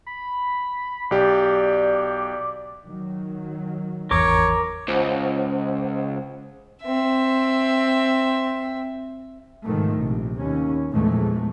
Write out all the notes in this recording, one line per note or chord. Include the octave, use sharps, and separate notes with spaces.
B5
B1 G4 D5
D#3 F#3
G#1 E2 A#4 C#5 D6
C#2 C5 F#5
C4 E5
G#2 B2 D#3 F3 A3
A#1 C3
D#2 C#4
A#1 E2 G#3 A3